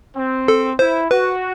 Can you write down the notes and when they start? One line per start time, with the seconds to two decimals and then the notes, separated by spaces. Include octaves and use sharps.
0.16 C4
0.48 A4
0.79 E4 C5
1.11 F#4 B4